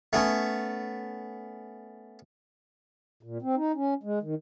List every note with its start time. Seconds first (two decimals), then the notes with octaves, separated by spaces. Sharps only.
0.13 A3 B3 C#4
3.23 A#2
3.42 C4
3.56 D#4
3.75 C#4
4.03 G#3
4.22 D#3